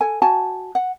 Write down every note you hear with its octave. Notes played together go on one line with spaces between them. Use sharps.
A4 G#5
F#4 G#5 A5
F#5